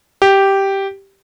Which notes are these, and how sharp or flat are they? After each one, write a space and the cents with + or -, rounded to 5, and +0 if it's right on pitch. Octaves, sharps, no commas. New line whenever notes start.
G4 -5